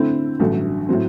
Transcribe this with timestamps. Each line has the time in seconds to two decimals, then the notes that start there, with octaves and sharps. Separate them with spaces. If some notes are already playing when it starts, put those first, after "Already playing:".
Already playing: D3 A3 C4 E4
0.40 A1 G2 D3 F#3 A3
0.89 A2 F#3 C4